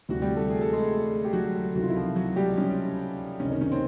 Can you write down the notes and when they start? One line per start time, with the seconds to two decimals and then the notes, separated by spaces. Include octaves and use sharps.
0.09 D2 C3 E3 G3 F#4
0.22 G3 G4
0.36 A3 A4
0.50 G#4
0.61 A4
0.73 G#3 G#4
1.25 G4
1.33 F#3 F#4
1.75 C#2 C3 D#3 F#3 F#4
1.82 F4
1.89 E4
1.96 F3 F4
2.15 F#3 F#4
2.36 G3 G4
2.57 C#4
3.40 C#2 C3 D#3 C#4
3.50 D#3 D#4
3.61 C#4
3.72 C4